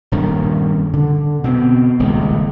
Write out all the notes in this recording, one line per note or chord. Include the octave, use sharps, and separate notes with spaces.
D#1 G2 D#3 C#4
D3
B2 C4
D#1 C#2